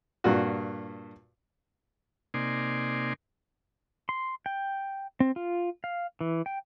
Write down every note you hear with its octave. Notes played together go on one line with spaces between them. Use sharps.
G2 A#2 F#4
C3 A#3 D#4 D5 G#5 C6
C6
G5
C4
F4
F5
E3
G5